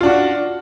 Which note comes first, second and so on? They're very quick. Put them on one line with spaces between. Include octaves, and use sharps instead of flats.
F4 D4 F#4